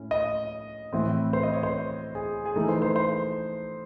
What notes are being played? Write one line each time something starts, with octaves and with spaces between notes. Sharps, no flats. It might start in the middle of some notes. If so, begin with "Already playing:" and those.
Already playing: A2 C#4
D#5
A2 E3 C4 E4
C5
D#5
C#5
C5
G#4
G#4
E3 A3 D#4 A4
C5
C5
C5